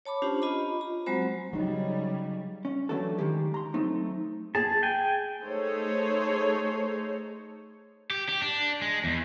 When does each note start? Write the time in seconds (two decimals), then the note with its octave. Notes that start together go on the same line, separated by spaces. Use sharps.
0.06 C#5 A5 B5 D6
0.22 C#4 D4 F4 G4 C5
0.42 F4 D#5 A#5 B5
0.81 A#5
1.06 F#3 G#3 C4 F#4 C5 B5
1.53 C#3 F#3 G3 D#4
2.65 C#4
2.89 E3 F#3 A3 D4 F#4 A4
3.18 D#3 G#3 G4
3.54 A#5 C6
3.74 F#3 A3 C4 D#4
4.55 G#4 A5
4.83 G5 G#5
5.42 A3 D#4 G#4 A4 C5 C#5
8.10 G4
8.29 G4
8.42 D4
8.82 G#3
9.04 E2